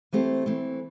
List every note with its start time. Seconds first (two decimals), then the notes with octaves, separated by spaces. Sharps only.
0.13 E3 A3 C4 G4 C5
0.46 E3 A3 C4